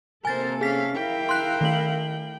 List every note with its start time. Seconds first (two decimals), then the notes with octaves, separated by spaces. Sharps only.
0.25 C3 A#3 A4 A#4 C5 G#5 A6
0.61 C#4 G#4 F5 B6
0.95 E4 A#4 F5 G5
1.29 C6 F#6
1.61 D#3 A3 F#7